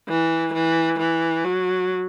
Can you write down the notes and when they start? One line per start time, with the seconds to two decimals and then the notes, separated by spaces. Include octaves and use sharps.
0.09 E3
0.53 E3
0.99 E3
1.44 F#3